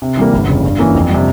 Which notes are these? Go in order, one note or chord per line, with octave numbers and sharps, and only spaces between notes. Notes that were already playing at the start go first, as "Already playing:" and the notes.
C3
E3 G3 A#3
G1
F2 C#3
G2
E3 A#3 C#4
F2
C3 G3